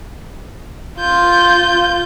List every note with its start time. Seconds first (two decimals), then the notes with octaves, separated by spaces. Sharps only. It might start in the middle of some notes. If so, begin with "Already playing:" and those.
0.99 F4 G6